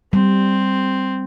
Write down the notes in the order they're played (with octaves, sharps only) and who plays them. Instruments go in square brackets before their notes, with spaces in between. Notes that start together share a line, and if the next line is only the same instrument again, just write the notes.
[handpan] G3 [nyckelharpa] C4